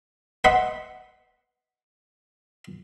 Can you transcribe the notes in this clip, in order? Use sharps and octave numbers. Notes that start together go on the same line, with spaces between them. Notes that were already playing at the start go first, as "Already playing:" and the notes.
B4 D#5 E5 F#5 C6